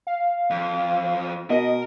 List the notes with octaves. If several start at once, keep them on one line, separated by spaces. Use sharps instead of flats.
F5
F2
B2 A#4 D#5